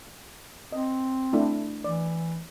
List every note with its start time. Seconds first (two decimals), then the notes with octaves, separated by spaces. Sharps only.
0.72 C4 D#5
1.33 A3 D4 E4
1.84 E3 D5